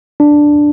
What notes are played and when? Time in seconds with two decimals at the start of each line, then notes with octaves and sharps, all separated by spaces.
0.20 D4